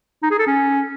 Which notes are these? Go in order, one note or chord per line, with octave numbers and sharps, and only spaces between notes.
D#4
G#4
A4
C#4